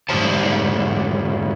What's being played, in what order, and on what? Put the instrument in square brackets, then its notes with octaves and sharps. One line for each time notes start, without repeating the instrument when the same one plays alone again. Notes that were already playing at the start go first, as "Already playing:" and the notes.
[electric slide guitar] G#2 D3 F3 G3 C5 A5